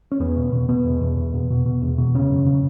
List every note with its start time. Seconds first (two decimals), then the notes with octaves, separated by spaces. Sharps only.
0.12 C#4
0.20 E2 B3
0.37 B2
0.52 B2
0.69 B2 B3
0.85 E2
1.01 E2
1.17 E2
1.34 B2
1.50 B2
1.66 B2
1.82 E2
1.98 B2
2.14 C#3 C#4
2.31 F#2
2.46 C#3